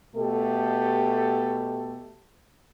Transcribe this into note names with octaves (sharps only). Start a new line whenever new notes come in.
B2 A3 G4 A4